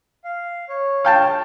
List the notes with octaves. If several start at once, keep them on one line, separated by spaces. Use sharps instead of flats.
F5
C#5
F5 G5 A5